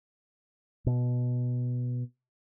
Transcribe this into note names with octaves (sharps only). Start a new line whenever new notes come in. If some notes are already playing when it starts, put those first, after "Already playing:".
B2